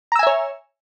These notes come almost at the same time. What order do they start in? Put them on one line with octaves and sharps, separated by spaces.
A#5 E6 G#5 E5 C#5